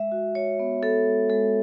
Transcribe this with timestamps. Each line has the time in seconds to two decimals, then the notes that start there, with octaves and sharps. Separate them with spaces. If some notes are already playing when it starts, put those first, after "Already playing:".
Already playing: G#3 E5
0.12 F#4
0.35 F#4 C#5
0.59 B3
0.83 B3 A4
1.06 G#3
1.30 G#3 A4